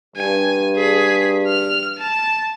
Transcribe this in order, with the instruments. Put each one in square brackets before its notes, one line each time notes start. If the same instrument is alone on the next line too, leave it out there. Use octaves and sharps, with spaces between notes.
[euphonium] G2 [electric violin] G#5
[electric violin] G#4 B6
F6
A5